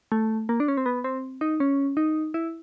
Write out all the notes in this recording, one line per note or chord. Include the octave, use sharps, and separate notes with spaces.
A3
A#3
D4
C#4
C4
B3
C4
D#4
C#4
D#4
E4